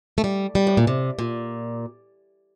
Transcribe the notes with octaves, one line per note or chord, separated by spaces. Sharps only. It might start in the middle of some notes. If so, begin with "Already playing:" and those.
A3
G3
G3
A2
A#2
C3
A#2